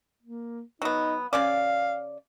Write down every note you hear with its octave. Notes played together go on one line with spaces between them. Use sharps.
A#3
F#3 B3 D#4
C#3 C#4 D5 F5